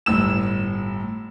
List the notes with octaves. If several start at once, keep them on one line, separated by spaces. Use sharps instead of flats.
G1 A2 E6 E7